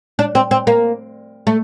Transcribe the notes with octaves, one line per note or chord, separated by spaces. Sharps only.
D4
C4
C4
A#3
A3